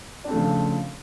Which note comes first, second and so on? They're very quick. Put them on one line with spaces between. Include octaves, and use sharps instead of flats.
D4 C4 A3 F3 C#3